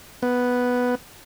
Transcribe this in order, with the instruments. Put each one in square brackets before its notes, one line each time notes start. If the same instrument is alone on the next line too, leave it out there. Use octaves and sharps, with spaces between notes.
[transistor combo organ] B3